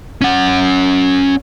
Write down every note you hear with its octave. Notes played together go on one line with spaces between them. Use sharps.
C#4 F#5